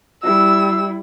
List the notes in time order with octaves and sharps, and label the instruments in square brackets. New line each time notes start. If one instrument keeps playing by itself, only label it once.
[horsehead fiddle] G3 E4 [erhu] E6